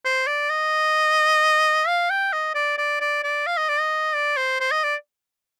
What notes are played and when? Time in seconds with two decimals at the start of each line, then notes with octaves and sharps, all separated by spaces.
0.05 C5
0.27 D5
0.50 D#5
1.87 F5
2.10 G5
2.33 D#5
2.55 D5
2.78 D5
3.01 D5
3.24 D5
3.47 F5
3.57 D#5
3.68 D5
3.80 D#5
4.15 D5
4.37 C5
4.60 C5
4.71 D#5
4.83 D5